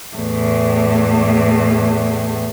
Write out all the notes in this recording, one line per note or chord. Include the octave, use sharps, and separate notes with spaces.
E2 A2